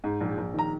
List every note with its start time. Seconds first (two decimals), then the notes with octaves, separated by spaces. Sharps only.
0.04 G#2
0.21 A#1
0.37 A#1
0.54 D#3
0.59 A#5